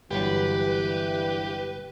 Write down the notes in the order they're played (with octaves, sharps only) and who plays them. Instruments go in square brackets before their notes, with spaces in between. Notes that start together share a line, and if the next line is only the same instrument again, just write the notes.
[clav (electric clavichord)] G1 F#3 [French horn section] G2 E3 [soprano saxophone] G4 [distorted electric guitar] B4